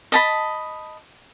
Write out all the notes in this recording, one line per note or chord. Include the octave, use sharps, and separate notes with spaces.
D#5 A5 B5